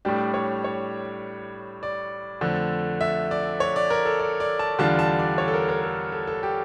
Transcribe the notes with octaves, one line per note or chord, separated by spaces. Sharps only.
A2 G3 D4 G4
C#5
C#5
D5
F2 D3 A3
E5
D5
C#5
D5
A#4
A4
D5
D5
A5
E2 D3 G3 D4 F4 A5
A5
D5
C#5
A4
A#4
A#4
A4
A4
A4
G4